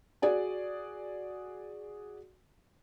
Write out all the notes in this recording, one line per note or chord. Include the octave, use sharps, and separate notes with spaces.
F#4 G#4 D5 G#5